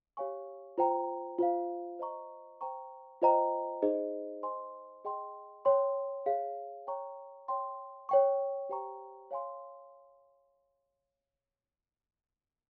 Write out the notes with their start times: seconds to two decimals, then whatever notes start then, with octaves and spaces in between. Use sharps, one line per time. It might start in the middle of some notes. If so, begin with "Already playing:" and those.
0.17 G4 C#5 F5 G#5 C#6
0.78 F4 C5 G5 A#5
1.39 F4 C5 F5
1.99 C5 D#5 A#5 C#6
2.61 C5 G5 A#5 C#6
3.22 F4 C5 D#5 G5 A#5
3.82 D#4 G#4 C5 D#5
4.43 C5 D#5 G#5 C6
5.05 G#4 D#5 G5 C6
5.65 C#5 G5 C6
6.26 G#4 C#5 F5
6.87 C#5 G5 A#5 C#6
7.48 C#5 G5 C6
8.09 C#5 G5 C#6
8.69 G4 C5 G5 A#5 C#6
9.31 C#5 F5 G#5 C6